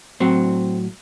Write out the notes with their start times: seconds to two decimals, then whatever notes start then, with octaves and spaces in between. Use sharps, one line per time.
0.20 A2 F#3 C4